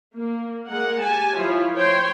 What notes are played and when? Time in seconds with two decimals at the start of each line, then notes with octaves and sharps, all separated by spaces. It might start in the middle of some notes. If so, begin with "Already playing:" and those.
0.16 A#3
0.68 G#3 A#3 A#4 F#5
1.02 G4 G#5 A5
1.36 F3 E4 F4 C#5
1.75 C5 C#5 G5 C6